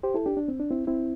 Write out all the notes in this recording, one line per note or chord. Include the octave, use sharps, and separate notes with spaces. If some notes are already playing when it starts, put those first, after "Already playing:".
G4 C5
E4 A4
D4 G4
D4
C4
D4
C4 E4
C4 E4